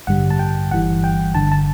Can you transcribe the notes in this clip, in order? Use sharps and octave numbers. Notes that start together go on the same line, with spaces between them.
A1 G2 D3 G3 F#5
A5
G5
G1 G2 E3 G3 F#5
G5
G1 G2 D3 A5
A5